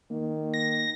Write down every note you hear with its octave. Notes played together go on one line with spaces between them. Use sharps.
D#3 A#3
A#6